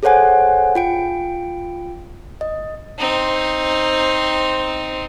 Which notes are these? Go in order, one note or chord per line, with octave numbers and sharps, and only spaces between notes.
G#4 A4 C5 C#5 F#5 G#5
F4 G5 D7
D#5
C4 D#4